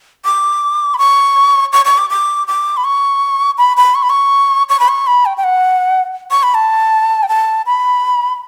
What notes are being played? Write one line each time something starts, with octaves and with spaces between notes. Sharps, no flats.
D6
B5
C#6
C#6
C#6
D6
D6
D6
B5
C#6
B5
B5
C#6
B5
C#6
C#6
B5
C#6
B5
G5
G5
F#5
C#6
B5
A5
G5
A5
B5